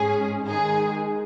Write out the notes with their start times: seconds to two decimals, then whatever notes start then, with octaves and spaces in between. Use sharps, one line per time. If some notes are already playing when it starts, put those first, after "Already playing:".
Already playing: G#2 G#3 C#4 G#4
0.48 D#3 G#3 D#4 G#4